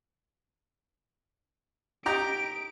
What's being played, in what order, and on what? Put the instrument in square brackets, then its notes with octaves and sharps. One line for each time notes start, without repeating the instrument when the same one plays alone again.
[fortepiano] D#4 G4 A#5 [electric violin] D7